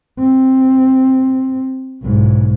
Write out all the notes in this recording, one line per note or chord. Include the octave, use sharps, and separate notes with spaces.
C4
B1 G#2